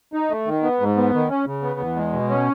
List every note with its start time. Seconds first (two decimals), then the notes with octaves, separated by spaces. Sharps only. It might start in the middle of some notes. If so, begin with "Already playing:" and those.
0.13 D#4
0.30 A3
0.47 D#3
0.63 B3
0.80 G#2
0.97 B3
1.14 D#3
1.30 C#4
1.46 C#3
1.62 B3
1.80 E2
1.96 G#3
2.13 B2
2.29 C#4